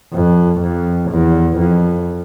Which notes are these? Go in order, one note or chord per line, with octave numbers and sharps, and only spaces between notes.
F2
F2
E2
F2